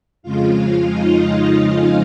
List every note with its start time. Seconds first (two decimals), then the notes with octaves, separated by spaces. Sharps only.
0.23 F2 C#3 F3 G#3 F4 F5
0.92 D#4 D#5
1.61 F4 F5